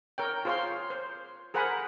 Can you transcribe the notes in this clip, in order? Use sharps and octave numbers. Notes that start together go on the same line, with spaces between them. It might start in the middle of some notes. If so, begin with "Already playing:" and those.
A#4 C#5 G5
F4 G#4 C5 C#5 F5 C6
C5
G#4 A#4 C5 F#5 G#5 B5